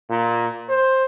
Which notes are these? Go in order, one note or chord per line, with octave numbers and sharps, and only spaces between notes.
A#2
C5